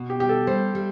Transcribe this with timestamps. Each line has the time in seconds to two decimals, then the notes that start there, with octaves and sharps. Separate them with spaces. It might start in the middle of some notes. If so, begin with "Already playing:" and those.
Already playing: B2
0.10 G4
0.20 G3 G4
0.29 A4
0.47 G3 C5
0.75 G3